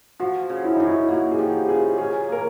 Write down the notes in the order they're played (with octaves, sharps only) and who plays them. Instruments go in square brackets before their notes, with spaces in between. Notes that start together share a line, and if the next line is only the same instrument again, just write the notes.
[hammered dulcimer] F3 [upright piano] F#4
[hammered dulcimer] C#3
[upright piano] E4
[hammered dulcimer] F#2 [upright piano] D#4
[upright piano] E4
[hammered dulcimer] A#3 [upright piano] F#4
[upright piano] G#4
[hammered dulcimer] F3 [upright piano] G4
[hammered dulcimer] C#3 [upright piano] G#4
[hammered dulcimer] C#4 [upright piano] G#4
[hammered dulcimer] A#3 [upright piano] A#4